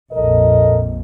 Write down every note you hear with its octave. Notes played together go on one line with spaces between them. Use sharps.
A#1 F2 A4 A#4 D#5